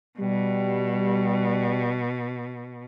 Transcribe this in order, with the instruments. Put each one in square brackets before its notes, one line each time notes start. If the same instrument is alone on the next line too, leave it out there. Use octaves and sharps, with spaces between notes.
[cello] B2 [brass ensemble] G3